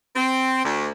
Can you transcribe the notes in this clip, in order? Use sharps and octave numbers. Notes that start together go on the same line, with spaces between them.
C4
D2